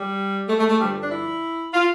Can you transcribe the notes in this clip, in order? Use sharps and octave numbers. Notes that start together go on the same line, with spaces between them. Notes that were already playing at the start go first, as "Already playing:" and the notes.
Already playing: G3
A3
A3
A3
G2 D3 F3 G3
D4
E4
F4